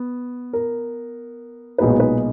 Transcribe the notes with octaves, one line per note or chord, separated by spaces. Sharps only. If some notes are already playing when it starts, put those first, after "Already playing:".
Already playing: B3
A#4
B1 A#2 G#3 B3 D#4 B4
B4